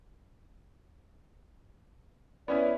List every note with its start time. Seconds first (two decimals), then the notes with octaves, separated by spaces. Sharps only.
2.48 B3 C#4 E4 D5